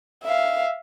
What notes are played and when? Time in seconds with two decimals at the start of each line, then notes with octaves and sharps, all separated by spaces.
0.24 E5 F5